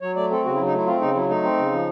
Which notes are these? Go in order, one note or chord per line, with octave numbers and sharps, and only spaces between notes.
F#3 C#5
A3 D5
C4 A4
C#3 F#4
E4
F#3
D#4
A3 E4
C4 F4
C#3 D#4
F#3 E4
A3 D#4
C4
C#3
F3